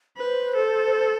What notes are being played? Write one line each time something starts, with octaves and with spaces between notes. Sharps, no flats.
B4 C5
A4